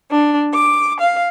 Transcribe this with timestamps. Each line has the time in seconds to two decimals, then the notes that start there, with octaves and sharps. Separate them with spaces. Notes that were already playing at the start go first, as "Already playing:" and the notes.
0.11 D4
0.53 D6
1.00 F5